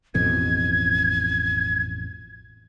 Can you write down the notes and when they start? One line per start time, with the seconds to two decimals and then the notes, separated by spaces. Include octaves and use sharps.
0.15 A1 F2 B2 G#6